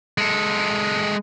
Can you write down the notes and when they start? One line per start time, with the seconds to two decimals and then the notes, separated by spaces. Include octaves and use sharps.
0.18 G#3 A4